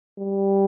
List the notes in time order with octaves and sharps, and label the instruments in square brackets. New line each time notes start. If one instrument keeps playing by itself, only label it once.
[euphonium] G3